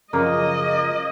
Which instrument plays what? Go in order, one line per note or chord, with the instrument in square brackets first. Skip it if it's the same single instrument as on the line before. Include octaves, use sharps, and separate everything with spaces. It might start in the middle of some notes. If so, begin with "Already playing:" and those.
[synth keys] F#2 C#3 F3 [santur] A#3 [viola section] D#5